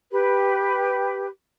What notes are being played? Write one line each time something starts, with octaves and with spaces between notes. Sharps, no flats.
G4 B4